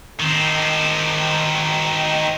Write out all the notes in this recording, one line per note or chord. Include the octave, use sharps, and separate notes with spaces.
D#3 C4